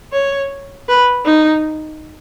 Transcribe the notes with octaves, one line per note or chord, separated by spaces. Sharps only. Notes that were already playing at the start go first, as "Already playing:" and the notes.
C#5
B4
D#4